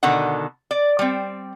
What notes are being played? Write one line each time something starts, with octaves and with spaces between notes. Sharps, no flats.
B2 D3 D#3 F#5
D5
G3 C4